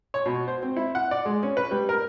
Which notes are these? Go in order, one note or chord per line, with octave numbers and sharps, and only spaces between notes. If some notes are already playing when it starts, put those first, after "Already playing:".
C#5
B2
C5
C4
E4
F#5
D5
G#3
C#4
B4
G3
A#4